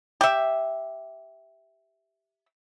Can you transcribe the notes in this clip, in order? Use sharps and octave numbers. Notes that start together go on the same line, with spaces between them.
G4 E5